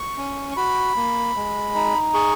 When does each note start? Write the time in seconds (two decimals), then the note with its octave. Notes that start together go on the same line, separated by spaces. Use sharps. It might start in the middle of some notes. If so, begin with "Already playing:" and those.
Already playing: C#6
0.18 C#4
0.51 C#6
0.57 F#4 B5
0.96 A#3
1.36 G#3
1.75 D#4
2.14 G#4 C#6